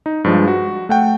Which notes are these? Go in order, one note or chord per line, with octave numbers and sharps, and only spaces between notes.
D#4
G2 F3 G#3
F#4
A3 F#5 G5